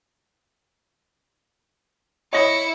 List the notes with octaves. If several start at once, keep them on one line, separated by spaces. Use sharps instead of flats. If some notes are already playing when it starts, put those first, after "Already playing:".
E4 C#5 D#5 A#6 C#7